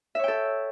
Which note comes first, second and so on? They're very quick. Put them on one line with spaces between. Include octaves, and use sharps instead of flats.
E5 C#5 G5 A4